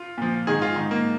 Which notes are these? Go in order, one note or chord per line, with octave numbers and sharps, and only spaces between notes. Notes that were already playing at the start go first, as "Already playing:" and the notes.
Already playing: F4
A#2 F3
G#2 D#3 G#4
F4
G#2 D#3
A#3